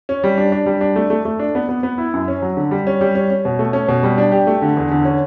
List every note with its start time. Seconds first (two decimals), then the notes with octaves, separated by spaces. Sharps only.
0.09 C#4
0.24 G3
0.38 D4
0.52 D4
0.66 G3
0.81 D4
0.96 A3
1.10 A3
1.25 A3
1.39 D4
1.55 B3
1.69 B3
1.83 B3
1.98 E4
2.14 F#2
2.28 C#4
2.42 F#3
2.57 D3
2.71 G3
2.87 C#4
3.01 G3
3.15 C#4
3.30 C#4
3.45 B2
3.59 A3
3.73 C#4
3.89 B2
4.03 G3
4.18 D4
4.32 G4
4.47 A3
4.62 D3
4.77 E2
4.91 D3
5.05 C#4